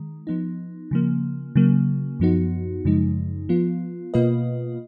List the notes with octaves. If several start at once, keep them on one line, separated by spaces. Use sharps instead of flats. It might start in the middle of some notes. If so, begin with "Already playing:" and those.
Already playing: D#3 G#3
F3 B3 D#4
C#3 F3 A#3
C#3 F#3 A#3
F#2 F3 B3 D#4 F#4
F#2 C#3 F3 G#3 D#4
F3 B3 F4
B2 A#3 F4 B4 D#5